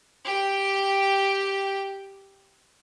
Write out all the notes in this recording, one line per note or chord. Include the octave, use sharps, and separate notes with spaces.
G4 G5